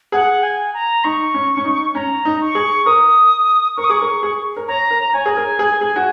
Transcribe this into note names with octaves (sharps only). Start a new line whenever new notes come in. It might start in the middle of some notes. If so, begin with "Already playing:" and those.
G#4 F#5
G#5
A#5
D#4 C#6
C#4
C#4
D#4
C#4 A#5
D#4
C#6
G#4
A#4 D#6
A#4 C#6
D#6
G#4 C#6
A#4
G#4
A#4
C#5 A#5
A#4
C#5 G#5
G#4
A#4
G#4
G#4
F#4